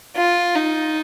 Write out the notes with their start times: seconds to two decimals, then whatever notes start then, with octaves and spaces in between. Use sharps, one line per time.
0.16 F4
0.55 D#4